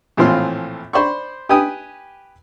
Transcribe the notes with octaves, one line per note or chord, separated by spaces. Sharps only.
A#1 A2 E3 C4 F4 F5
C5 D5 B5 C#6
G4 B4 G5 G#5 D#6